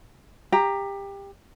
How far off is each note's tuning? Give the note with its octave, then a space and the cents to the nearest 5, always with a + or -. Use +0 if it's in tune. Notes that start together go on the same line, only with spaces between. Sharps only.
G4 +20 A#5 +0